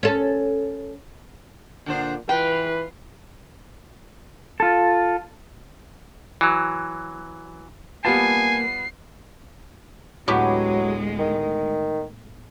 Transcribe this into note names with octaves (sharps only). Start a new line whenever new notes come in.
C#4 A4
A#2 D3 D4 C5
E3 F4 B4 G5
F4 A4
E3 F#3
G3 A#3 B3 F4 G#5 A5 C7
D2 A2 F#3 G#3 B3 G4
D#3